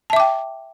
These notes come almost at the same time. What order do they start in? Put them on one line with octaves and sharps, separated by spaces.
A5 E5 D6 G5